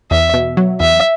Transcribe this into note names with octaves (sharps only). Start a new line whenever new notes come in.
E2 E5
B2
F#3
E2 E5